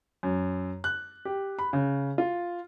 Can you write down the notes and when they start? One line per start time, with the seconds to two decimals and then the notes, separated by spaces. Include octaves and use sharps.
0.23 F#2
0.84 F#6
1.25 G4
1.59 B5
1.73 C#3
2.18 F4